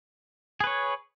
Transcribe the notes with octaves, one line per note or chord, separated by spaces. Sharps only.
G#4 B4 C#5